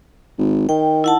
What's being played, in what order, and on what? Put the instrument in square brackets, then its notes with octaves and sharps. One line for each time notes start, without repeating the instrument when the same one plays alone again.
[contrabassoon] G#1
[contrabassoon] D#3 [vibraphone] G5
[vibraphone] E4 F#5 A5